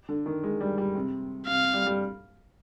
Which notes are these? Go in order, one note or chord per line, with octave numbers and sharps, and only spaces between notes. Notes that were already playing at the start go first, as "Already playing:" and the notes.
D3
D#3
G#3
G3
G3
C3
C3 F5
G3
G3